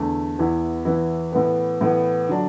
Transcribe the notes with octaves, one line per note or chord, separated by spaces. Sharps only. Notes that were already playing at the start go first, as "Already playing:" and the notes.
Already playing: E2 D3 A3
E2 E3 B3 E4
E2 E3 B3 E4
A2 E3 B3
A2 E3 B3
D3 F#3 D4